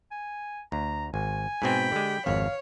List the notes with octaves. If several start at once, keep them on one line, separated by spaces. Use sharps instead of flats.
G#5
D2 A#5
G#1 G#5
G#2 B2 C4 G5 B5
D3 G#3 G4
G#1 F2 C#5 F5